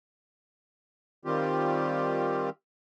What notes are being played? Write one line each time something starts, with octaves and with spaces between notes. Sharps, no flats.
D#3 G3 C4 F4 G4